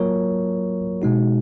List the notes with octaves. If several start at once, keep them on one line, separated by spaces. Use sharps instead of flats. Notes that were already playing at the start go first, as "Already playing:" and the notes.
Already playing: F#3 A#3 F4 A#4 C#5
B2 G#3 D#4 F#4